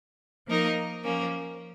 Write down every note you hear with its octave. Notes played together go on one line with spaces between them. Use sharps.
F3 A#3 D#4 A#4 D#5
F3 A#3 C#4